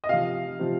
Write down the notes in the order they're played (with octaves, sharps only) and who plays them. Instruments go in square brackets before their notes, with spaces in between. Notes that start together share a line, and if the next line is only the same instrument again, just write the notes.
[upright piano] D#5
C3 F3 F5
C3 F3